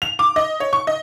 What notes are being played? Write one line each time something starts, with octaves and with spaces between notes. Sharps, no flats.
F7
D6
D#5
C#5
C#6
D#5